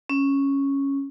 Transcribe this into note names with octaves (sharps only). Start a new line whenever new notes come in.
C#4